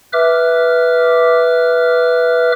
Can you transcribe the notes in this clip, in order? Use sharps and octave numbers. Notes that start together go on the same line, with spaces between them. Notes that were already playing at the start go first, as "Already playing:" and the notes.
B4 E5 D6 F6